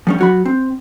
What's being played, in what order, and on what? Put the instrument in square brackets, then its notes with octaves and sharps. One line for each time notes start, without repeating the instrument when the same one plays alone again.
[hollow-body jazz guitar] F3 G3 C#4
F#3 F#4 B5
C4